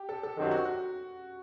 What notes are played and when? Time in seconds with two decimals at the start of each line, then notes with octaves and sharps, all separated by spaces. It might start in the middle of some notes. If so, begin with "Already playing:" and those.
Already playing: G4
0.09 A4
0.23 A4
0.37 F#2 D#3 F#3 C4 G4 A4
0.51 F#4
0.65 F#4